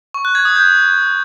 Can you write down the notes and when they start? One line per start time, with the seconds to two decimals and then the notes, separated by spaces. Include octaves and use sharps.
0.14 C#6
0.25 F#6
0.35 G#6
0.45 D#6
0.55 G6